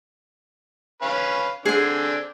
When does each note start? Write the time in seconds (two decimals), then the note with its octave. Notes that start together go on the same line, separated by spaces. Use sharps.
1.02 C#4 B4 F5
1.66 D3 C4 D4 G#4 G#5